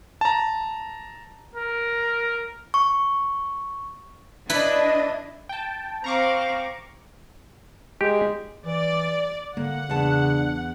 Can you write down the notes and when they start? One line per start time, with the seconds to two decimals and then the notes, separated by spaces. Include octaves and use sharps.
0.21 A5 A#5
1.56 A#4
2.74 C#6
4.50 D4 E4 B4 D#5 B5
5.49 G5 A5
6.04 C4 F5 A#5 C#6 D6
8.01 G#3 G4
8.66 E3 D5
9.57 D3 A#3 F#5
9.90 E2 C#3 D4 A5